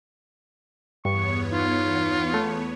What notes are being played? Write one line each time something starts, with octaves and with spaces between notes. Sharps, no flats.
E2 G2 B3 C#5 C#6
D#4 F4
A3